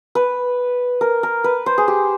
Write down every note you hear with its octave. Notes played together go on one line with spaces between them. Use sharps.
B4
A#4
A#4
B4
C5
G#4
G4